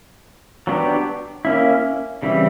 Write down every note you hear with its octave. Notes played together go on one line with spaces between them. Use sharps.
F#3 B3 D4 G4
A#3 C#4 E4
C#3 E3 G3 C4 E4